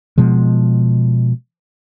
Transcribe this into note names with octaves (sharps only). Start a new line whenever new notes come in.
B2 F3 G#3